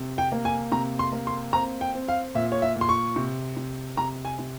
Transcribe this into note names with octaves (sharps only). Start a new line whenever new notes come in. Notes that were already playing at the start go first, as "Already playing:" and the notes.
Already playing: C3
G5
A#3
G#5
C3 A#5
C6
A#3
C6
C4 A#5
G5
C4
F5
A#2 E5
C#5
E5
A#2
C6
C#6
C3
C3
C3 A#5
G#5
C3